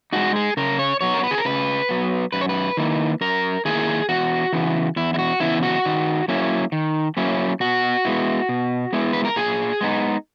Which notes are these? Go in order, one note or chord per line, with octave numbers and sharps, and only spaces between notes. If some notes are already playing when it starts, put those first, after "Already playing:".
G#3 D#4 F#4
G#4
C#3 A#4
C#5
F#3 B3 C#5
A#4
B4
G#4
A#4
C#3 B4
F#3 B3
F#2 B4
C#5
B4
D#3 A#3 E4
F#2 A#4
D#3 A#3 E4 G#4
E2 F#4
C#3 E3 B3
E2 E4
E4
F#4
C#3 E3 B3 E4
F#4
D#3
F#3 A#3 C#4 E4
D#3
F#3 A#3 C#4 E4
B2 F#4
G#3 B3 E4
B2
G#3 B3 E4
B4
A#4
A#2 G#4
G#3 B3 D#4